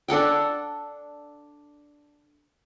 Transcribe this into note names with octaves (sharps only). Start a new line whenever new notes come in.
D4 A4 F#5 G5